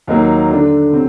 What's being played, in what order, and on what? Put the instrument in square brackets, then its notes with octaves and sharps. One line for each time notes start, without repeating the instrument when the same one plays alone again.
[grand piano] D#2 D#3 F#3 A#3
D3 A3 D4
C3 F#3 C4